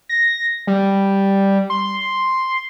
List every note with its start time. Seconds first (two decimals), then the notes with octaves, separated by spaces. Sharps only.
0.09 A#6
0.67 G3
1.70 C6